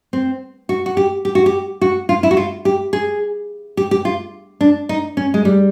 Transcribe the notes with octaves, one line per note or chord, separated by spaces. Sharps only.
C4
F#4
F#4
G4
G4
F#4
G4
F#4
F4
E4
F#4
F4
G4
G#4
G4
G4
F4
D4
D#4
C#4
G#3
G3